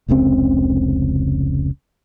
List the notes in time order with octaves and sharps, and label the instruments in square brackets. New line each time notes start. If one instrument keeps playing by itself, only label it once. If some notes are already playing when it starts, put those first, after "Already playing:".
[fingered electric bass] F1 C#2 C#3 C4